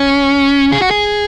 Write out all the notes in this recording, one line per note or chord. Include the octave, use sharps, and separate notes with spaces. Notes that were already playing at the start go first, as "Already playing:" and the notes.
Already playing: C#4
G#4
F#4
G#4